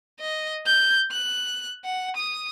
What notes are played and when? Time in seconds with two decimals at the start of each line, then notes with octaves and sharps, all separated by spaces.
0.20 D#5
0.66 G6
1.12 F#6
1.85 F#5
2.17 D#6